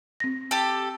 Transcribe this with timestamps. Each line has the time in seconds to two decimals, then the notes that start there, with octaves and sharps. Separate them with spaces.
0.20 C4 A#6
0.51 G4 A4